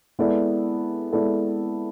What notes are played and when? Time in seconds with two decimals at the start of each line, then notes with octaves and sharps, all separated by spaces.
0.19 G#3 B3 E4 A4 D5
1.12 G#3 B3 E4 A4 D5